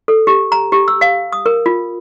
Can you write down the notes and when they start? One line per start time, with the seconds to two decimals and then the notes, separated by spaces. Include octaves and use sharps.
0.08 A4
0.27 G4
0.52 A#5
0.72 G4
0.88 E6
1.01 F5
1.32 D#6
1.46 A#4
1.66 F4